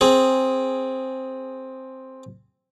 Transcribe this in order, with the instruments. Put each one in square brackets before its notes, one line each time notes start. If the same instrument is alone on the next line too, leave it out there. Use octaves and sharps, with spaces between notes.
[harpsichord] C4 G#4